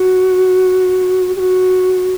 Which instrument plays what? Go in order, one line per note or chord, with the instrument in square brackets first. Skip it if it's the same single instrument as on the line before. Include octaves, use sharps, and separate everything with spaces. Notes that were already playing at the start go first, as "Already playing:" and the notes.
Already playing: [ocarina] F#4
G4
F#4